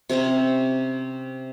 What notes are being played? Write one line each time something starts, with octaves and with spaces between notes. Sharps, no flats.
C3 C4 C#4 A#5